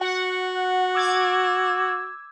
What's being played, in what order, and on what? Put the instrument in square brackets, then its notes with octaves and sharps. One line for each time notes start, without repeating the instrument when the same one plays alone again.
[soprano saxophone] F#4 [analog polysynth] F#5
[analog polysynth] D6 E6 G#6